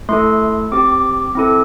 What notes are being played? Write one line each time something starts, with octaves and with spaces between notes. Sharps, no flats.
A3 E4 A4 C6
C4 G4 D6
C4 E4 A4